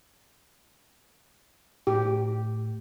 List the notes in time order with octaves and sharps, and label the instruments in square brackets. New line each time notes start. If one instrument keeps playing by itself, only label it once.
[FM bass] A2 [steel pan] G4